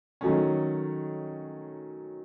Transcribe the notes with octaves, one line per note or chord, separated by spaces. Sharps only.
D#3 F#3 A3 C#4